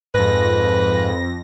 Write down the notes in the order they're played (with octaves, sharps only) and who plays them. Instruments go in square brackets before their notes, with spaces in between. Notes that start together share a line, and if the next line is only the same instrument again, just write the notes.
[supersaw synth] F2 A#6 [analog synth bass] G#2 [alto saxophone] B4